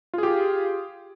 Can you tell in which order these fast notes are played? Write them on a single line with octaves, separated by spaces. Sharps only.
F4 G#4 G4